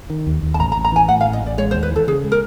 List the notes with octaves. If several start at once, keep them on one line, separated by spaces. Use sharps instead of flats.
D#3
D#2
D#2
A5
A1 A#5
A#5
A1
A#5
E3 G#5
A2 F#5
F5
A1
D#5
A1 D5
G#3 C#5
C5
D#2
B4
E3 A4
C#3 G#4
G#3
A#4